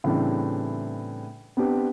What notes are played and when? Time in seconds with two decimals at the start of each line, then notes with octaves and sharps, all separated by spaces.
0.04 A2 C#3 E3 G3 C4 D4
1.57 B3 C4 D4 G4 B4